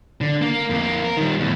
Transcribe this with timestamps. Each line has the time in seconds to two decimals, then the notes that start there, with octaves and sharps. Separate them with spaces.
0.21 D3
0.42 A#3
0.70 F2 A#3
1.04 A#4
1.17 D#3 G3
1.40 E2 A2